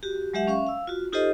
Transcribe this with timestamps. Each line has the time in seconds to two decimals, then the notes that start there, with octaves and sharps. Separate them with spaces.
0.03 F#4 G4
0.33 F#3 G#3 G4 E5 F#5
0.48 C#4 E5 F5 C#6
0.67 F5 E6
0.87 F4 F#4
1.13 D#4 F4 G4 A4 C5 D#5